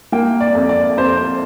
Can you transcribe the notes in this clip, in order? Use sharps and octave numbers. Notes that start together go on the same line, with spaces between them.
A#3 G5
D5
F2
D5
F2 C5